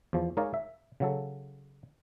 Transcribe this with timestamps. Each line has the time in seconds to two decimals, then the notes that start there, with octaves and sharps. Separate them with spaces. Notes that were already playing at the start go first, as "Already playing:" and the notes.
0.13 E2 F3
0.37 G#3 D#4 A#4 C#5 D5 F5
0.54 E5
1.00 C#3 F#3 A4